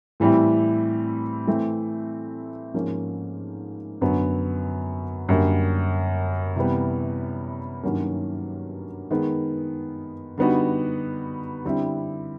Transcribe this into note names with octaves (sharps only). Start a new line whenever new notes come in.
A2 E3 G3 C4 E4
E3 A3 C4
G#2 F3 A#3 C#4
F#2 D3 F#3 B3
F#2 D3 G3 A#3
C3 E3 G3 B3
G2 D#3 F#3 A#3 C#4
D#3 G#3 B3
D3 G3 B3 D#4 F#4
D3 G3 C4 E4